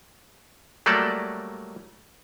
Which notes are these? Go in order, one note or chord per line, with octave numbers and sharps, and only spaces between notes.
F#3 G3 A3 A#3 A4 D5